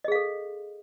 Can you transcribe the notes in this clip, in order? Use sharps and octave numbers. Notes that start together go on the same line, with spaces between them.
G#4 A4 D#5 F5